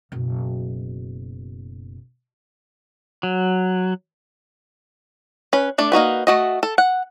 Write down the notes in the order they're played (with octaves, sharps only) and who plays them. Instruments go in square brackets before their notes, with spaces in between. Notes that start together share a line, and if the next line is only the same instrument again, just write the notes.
[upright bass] F#1 B2
[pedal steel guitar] F#3
[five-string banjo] C#4 B4
A3 D4 D5
A#3 D#4 F#4 B4
A3 F#4 D#5
A4
F#5